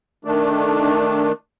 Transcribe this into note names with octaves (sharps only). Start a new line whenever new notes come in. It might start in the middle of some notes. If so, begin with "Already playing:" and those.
D#3 A3 D4